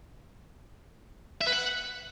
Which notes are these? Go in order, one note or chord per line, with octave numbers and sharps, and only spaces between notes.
E5
B4
F#5